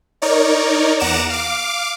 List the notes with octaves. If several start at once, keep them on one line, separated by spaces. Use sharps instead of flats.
D#4 A#4 C#5 D5
E2 F#5 A#5 D6 E7
F5 D6